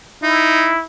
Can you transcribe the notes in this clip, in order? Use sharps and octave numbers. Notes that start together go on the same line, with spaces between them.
D#4 E4